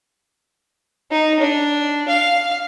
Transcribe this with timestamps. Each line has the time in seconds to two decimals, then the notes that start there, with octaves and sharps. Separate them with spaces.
1.11 D#4
1.40 D4
2.08 F5